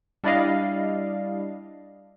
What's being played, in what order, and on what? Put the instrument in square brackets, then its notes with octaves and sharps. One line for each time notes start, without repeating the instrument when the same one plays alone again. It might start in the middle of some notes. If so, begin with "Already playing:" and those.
[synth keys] G3 D4 E4 D5 D#5 F5